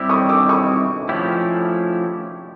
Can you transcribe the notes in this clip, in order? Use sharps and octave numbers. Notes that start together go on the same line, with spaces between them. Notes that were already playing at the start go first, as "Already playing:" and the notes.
Already playing: G3 C4 E4 G4 D6 E6
C#6 D#6
D6 E6
C#6 D#6
F3 A3 C#4 E4 G4